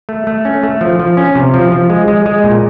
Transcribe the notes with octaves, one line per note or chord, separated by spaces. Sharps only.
A3
A3
C#4
A3
F3
F3
C#4
C3
F3
F3
G#3
G#3
G#3
A#2